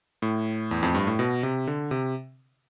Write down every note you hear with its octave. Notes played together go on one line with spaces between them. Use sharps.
A2
E2
F2
G2
A2
B2
C3
D3
C3